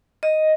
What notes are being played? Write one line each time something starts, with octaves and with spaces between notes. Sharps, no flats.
D#5